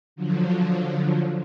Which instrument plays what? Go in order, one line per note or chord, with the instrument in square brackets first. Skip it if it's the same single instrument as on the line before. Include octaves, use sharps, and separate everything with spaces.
[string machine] D3 F3 F#3